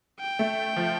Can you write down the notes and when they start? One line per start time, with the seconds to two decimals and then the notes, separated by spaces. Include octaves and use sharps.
0.20 G5
0.39 A3
0.77 F3